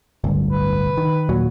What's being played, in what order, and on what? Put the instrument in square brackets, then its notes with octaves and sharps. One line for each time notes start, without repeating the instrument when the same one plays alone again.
[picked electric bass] D1 G1 C2
[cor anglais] B4
[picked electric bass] D#3
D#2 A#2 F#3